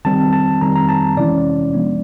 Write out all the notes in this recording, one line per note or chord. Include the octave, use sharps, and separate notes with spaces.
D#3 G3 C4 A5
A5
D#3 G3 C4 A#5
A#5
A5
C3 E3 G#3 C#4 E4 D5
F3 G#3 B3 D4